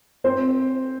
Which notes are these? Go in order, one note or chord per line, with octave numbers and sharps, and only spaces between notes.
C4 C5